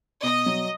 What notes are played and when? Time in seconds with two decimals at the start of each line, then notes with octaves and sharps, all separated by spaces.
0.23 B2 D#5
0.46 F#3